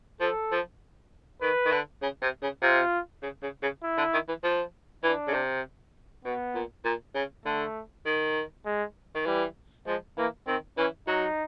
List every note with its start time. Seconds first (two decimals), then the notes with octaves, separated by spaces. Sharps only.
0.21 F3 A4
0.51 F3
1.41 D#3 B4
1.65 D#3
1.72 D3
2.02 C#3
2.22 C3
2.43 C#3
2.62 C3 F4
3.23 C#3
3.43 C#3
3.63 C#3
3.83 E4
3.98 D3
4.13 D#3
4.28 E3
4.44 F3
5.04 E3 D4
5.28 C#3
5.34 C3
6.25 B2 B3
6.55 A#2
6.85 A#2
7.15 C#3
7.45 D3 A3
8.06 D#3
8.66 G#3
9.15 D#3
9.26 E3 G3
9.87 F3 G#3
10.17 E3 A#3
10.47 D#3 C4
10.78 E3 C#4
11.08 F#3 D#4